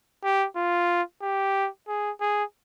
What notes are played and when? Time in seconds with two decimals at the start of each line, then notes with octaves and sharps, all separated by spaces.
0.23 G4
0.56 F4
1.22 G4
1.88 G#4
2.20 G#4